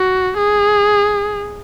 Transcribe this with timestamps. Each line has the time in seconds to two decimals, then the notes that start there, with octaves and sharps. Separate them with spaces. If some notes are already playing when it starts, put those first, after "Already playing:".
Already playing: F#4
0.37 G#4